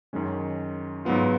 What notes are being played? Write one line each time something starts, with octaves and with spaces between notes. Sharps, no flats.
F#2 D#3 G#3 C#4
G#2 F#3 B3 F4